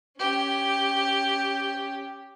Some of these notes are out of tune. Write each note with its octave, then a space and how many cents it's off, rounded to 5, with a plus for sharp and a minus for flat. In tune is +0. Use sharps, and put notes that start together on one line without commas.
C#4 +5 G4 +0